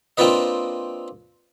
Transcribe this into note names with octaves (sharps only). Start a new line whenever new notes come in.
A#3 C4 D4 F4 B4 D#5